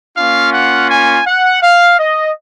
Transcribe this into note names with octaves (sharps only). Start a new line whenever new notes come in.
A#3 C#4 F4 F5
F#5
G#5
F#5
F5
D#5